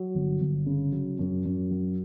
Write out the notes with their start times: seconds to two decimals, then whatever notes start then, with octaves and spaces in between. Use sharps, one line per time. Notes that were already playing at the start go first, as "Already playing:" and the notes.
Already playing: F#3
0.15 G1
0.41 G1
0.66 C#3
0.92 F#3
1.19 F#2
1.45 F#2
1.71 F#3